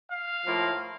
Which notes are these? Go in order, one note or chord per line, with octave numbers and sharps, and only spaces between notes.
F5
A2 F3 A#3 F4